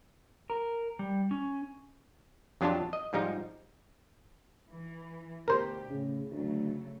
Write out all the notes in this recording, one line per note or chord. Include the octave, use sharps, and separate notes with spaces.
A#4
G3
C#4
F2 F#3 D4 F4 G4 A5
D#5
G#2 F3 G3 D#4
E3
D2 B2 G4 A#4 C5
A2 C#3
D2 C#3 F#3 A3